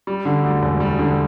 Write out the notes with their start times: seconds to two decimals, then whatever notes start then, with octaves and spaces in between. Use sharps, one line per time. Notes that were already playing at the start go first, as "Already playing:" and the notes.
0.07 G3
0.25 D3
0.44 D2
0.62 E1
0.80 G3
0.99 D3